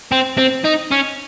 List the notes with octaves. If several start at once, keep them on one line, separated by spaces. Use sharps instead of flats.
C4
C4
D#4
C#4